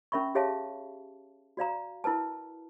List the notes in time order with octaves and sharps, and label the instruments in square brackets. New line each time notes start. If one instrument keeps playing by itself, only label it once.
[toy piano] C#4 A#4 E5 B5 C#6
G4 G#4 C#5 E5 F5 A5
F#4 D5 F5 A#5
E4 A#4 B4 A5